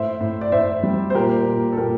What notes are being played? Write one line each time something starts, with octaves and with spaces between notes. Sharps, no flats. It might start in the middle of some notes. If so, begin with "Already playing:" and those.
Already playing: A2 C5 E5
A2
D5
A2 C5 E5
G3
C5
A#2 G4 A#4
A#2
A4
A#2 G4 A#4